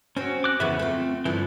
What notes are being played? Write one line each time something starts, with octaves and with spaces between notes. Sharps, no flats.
C4 C#4 F#4 C5
D6 F#6
F2 C#3 E3 B3 B4 E5
A3 C4 F4
G2 D3 E3 F3 E4